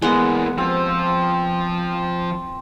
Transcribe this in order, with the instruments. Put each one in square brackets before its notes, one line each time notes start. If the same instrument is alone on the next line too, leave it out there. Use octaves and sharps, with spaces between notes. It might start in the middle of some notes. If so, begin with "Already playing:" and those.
[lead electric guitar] E3 A#3 [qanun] G#3 B3 F#5
[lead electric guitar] F3 F4 [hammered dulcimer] C4